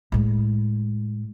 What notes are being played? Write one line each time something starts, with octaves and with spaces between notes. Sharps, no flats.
A2 G#3